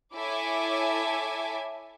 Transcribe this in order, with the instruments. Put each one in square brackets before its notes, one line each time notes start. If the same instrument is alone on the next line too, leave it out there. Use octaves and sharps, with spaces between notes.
[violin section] E4 A4 C#5 E5 G#5 D6